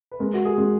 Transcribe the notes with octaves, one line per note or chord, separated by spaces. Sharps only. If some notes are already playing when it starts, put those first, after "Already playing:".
B4
G#3 A#4
F#4
G#4
G#3